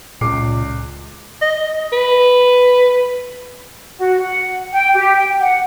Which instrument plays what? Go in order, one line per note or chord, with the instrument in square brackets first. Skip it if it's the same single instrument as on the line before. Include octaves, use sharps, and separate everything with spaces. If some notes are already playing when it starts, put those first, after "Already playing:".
[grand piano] C#2 D6 C7 [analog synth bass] A#2
[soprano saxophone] D#5
B4
[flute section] F#4
F#5
G5
G4
G5
F#5